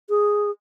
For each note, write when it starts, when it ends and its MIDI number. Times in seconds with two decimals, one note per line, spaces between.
0.09 0.50 68